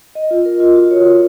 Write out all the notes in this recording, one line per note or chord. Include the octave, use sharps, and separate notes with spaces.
D#5
F4
A#4
F4
F#4
C#5
A#4